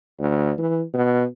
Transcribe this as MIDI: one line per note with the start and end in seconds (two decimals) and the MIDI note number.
0.19 0.52 38
0.58 0.82 52
0.94 1.24 47